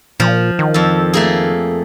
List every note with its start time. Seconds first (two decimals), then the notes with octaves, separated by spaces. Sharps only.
0.20 A#2 F3
0.59 D#3
0.74 F2 A4
1.13 A3 A#3 G#4